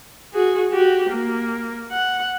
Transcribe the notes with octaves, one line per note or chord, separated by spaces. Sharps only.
F#4 G#4
F#4 G4
A#3
F#5